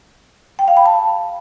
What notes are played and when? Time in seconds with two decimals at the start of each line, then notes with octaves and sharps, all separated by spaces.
0.59 G5
0.68 F5
0.77 B5
0.86 A5